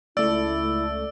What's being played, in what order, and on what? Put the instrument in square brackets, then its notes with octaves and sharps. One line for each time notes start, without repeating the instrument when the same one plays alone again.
[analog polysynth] C#2 A3 [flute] E4 [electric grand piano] D5 [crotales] E6